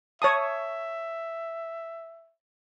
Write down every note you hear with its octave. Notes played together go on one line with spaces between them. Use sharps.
C#5 E5 A5 D#6